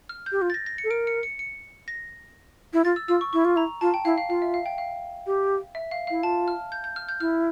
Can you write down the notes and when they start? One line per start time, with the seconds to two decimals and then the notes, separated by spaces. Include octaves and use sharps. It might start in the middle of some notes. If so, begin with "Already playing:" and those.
0.09 F6
0.26 G6
0.32 G4
0.42 F4
0.50 A6
0.54 A#6
0.66 A#6
0.78 C#7
0.84 A4
0.90 A#4 D7
1.07 C#7
1.23 C#7
1.39 C#7
1.88 A#6
2.73 E4
2.85 F4 A6
2.96 E6
3.08 F4 E6
3.21 C#6
3.33 E4 C#6
3.45 F4
3.56 E4 A#5
3.81 F4 A5
3.94 G5
4.05 E4 F5
4.18 F5
4.29 F4 F5
4.42 E5
4.54 F5
4.66 G5
4.78 F5
5.27 G4
5.75 E5
5.91 F5
6.07 E4 F5
6.23 F4 A5
6.48 F6
6.72 G6
6.84 G6
6.96 F6
7.09 G6
7.20 E4 F6